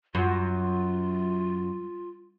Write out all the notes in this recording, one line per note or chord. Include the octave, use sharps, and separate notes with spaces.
F#2 F4